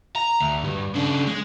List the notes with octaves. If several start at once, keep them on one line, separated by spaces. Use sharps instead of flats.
A#5
D2
G2
C#3 D4
G#3